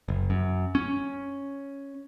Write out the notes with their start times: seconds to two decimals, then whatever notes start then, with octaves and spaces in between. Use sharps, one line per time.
0.08 F#1
0.30 F#2
0.75 C#4